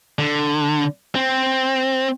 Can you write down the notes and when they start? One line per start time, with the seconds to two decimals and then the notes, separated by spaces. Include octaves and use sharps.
0.19 D3
1.15 C4